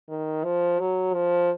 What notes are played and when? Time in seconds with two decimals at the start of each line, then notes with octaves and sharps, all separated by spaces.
0.09 D#3
0.44 F3
0.79 F#3
1.14 F3